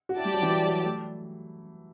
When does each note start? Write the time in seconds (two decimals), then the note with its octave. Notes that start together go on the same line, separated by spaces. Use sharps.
0.09 F#4
0.16 E4 G4 D5 A5
0.25 G3
0.34 F#3
0.42 E3
0.50 F#3
0.67 F#3
0.84 A3